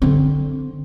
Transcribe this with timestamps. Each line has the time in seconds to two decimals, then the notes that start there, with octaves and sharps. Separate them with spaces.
0.02 D3 C4